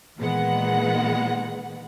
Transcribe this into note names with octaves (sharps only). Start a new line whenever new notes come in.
A#2 D#3 E3 G#3 B3 F#5